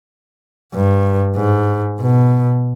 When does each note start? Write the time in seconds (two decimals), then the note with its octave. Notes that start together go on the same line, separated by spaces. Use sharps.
0.73 G2
1.36 G#2
2.00 B2